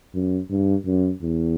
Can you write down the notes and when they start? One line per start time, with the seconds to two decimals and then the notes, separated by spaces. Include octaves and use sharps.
0.14 F#2
0.50 G2
0.86 F#2
1.22 E2